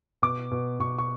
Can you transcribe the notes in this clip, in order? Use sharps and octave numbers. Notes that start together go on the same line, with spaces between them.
B2 D6
B2
B2 C#6
C#6